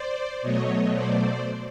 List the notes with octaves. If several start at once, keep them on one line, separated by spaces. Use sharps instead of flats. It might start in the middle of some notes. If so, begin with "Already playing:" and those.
Already playing: C5 D5
B2 F#3 A3 C#5 D#5
C5 D5